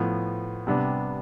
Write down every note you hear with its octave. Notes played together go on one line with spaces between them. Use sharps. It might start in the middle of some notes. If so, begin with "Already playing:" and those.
Already playing: A2 F3 B3
C3 G3 B3 D4